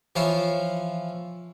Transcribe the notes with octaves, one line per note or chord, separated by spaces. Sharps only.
E3 F3 F4 C5 C#5